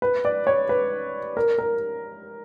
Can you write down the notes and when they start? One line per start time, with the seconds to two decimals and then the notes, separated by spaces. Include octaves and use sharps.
0.02 B4
0.25 D5
0.47 C#5
0.69 B4
1.37 A#4
1.58 A#4